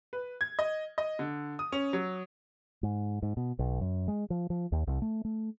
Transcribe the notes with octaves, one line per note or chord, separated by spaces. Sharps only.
B4
G#6
D#5
D#5
D3
D#6
C#4
F#3
G#2
G#2
B2
B1
F#2
G#3
F3
F3
D#2
C2
A3
A3